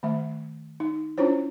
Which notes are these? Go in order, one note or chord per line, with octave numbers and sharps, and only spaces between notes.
D#3 A3 E5
D#4
C#4 D4 E4 F4 C5 C#5